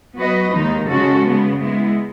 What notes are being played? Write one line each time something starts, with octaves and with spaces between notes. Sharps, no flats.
F#3 B3 F#4 B4 D#5
D#2 D#3 G#3 D#4
C#3 G#3 C#4 F#4 A4
C#3 G#3 B3
G#3 B3 E4